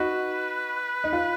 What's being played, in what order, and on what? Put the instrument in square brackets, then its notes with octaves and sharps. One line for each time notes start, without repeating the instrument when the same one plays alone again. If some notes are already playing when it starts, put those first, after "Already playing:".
Already playing: [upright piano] D#4 F#4 [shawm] B4
[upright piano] D#4
F4